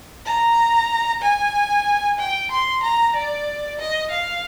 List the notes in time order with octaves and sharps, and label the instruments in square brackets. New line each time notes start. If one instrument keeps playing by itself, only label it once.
[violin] A#5
G#5
G5
C6
A#5
D5
D#5
F5